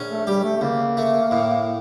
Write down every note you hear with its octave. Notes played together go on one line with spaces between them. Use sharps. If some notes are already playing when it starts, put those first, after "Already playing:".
Already playing: A#1 C#4
A3
G3 G4
A3
A3
C#2 A#3
A3
A2